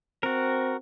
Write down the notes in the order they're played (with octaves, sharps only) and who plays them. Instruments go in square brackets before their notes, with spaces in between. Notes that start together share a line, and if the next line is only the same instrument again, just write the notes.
[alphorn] C4 [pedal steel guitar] F#4 A#4